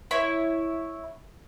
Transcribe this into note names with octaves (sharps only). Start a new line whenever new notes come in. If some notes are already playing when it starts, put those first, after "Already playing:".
E4 C#5